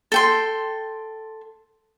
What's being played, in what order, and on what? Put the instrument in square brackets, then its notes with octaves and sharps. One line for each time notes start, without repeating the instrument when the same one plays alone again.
[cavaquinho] A4 G5 C6